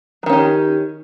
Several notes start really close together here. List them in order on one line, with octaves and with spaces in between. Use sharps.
F#3 D#3 C#4 G4